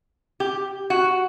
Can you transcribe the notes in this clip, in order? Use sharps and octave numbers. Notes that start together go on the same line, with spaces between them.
G4
F#4